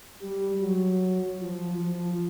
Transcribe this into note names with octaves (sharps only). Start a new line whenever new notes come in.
G3
F#3
F3
F3